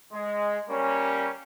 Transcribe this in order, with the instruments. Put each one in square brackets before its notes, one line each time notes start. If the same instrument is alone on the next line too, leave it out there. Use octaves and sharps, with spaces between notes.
[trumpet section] G#3
G3 A#3 C#4